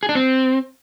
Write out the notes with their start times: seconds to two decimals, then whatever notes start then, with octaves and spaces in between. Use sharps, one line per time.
0.03 G#4
0.09 D4
0.15 C4